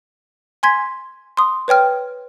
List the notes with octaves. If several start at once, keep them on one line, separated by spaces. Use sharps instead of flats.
G#5 C6 G#6 B6
C6 D#6
B4 C#5 G5 F6